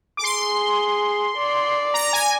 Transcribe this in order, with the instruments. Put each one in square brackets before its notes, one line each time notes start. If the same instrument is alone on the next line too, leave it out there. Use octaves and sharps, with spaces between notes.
[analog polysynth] D6
[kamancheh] G#4 [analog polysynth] C6
[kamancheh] D5
[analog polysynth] A#5
G#5